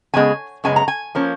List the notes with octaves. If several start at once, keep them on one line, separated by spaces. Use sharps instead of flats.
F#2 C#3 G#3 B3 G#5
F#2 C#3 G#3 B3 G#5
A#5
G#5
F3 A#3 C#4